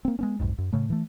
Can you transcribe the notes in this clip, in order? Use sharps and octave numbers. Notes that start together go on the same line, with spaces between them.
A#3 C4
G#3 B3 C#4
B1 F2 G#2
F#2
A2 C#3 A3
E3 A3